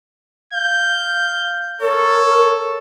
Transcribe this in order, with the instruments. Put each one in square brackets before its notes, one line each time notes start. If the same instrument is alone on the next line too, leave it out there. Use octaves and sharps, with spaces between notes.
[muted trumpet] F5 [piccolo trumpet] G6
[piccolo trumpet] A4 [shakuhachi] A#4 [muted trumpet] C#5